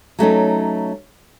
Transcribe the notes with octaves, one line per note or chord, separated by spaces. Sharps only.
F#3 A3 C#4 D#4